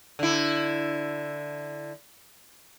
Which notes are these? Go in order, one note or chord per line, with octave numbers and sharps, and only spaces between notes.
D3 E4